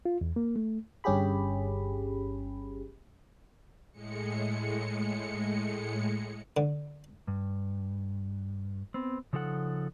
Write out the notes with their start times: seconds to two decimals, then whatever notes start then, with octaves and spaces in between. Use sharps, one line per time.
0.05 F4
0.21 E2
0.36 A#3
0.56 A3
1.04 G1 G2 C#4 G4 G#4 B5
3.92 A2 G#3 C#7
6.57 D3
7.27 G2
8.94 B3 C4
9.33 C#3 F3 D#4 A4 F#5